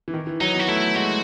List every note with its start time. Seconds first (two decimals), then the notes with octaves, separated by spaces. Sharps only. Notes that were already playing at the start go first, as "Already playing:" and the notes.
0.08 E3
0.14 D#3
0.27 E3
0.41 F#3 D#4
0.54 B3
0.60 F#4
0.68 A3 E4
0.96 G#3 F#4